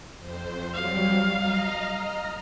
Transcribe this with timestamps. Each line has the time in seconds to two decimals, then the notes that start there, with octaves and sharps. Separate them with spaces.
0.19 F2 C5
0.74 F#3 G3 F5
1.33 D#5 A#5 F6